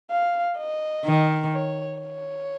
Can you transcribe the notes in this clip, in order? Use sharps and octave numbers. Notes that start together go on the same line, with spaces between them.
F5
D#5
D#3
C#5
C#5